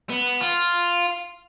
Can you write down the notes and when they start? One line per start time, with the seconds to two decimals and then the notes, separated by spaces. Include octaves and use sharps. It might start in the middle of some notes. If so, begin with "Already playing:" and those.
0.10 B3
0.40 F4